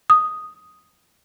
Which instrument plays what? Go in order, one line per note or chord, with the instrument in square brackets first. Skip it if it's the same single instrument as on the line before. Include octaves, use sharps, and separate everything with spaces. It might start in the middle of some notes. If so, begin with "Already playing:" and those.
[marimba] D#6